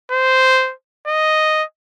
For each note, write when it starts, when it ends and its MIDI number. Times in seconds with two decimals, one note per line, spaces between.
0.11 0.73 72
1.08 1.64 75